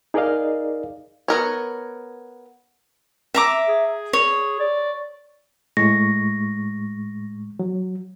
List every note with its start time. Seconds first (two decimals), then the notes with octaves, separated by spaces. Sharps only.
0.14 D#4 G#4 A#4 D5 D#5 F5
1.28 B3 A#4 C#5
3.34 E5 A#5 D6
3.68 G#4
4.13 C#5
4.60 D5
5.77 A2 G#3 C#6 A#6
7.59 F#3